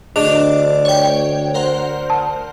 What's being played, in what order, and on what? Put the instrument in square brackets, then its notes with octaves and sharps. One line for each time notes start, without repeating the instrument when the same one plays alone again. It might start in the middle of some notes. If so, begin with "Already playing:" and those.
[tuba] D2 [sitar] D4 [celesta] G#4 D#5 F7 [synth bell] D6
[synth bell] C#5 G5
A#4 C5 F#5
[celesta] A5